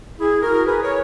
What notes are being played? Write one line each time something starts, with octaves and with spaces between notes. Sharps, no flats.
E4 G#4
F#4 A#4
G#4 B4
A#4 C#5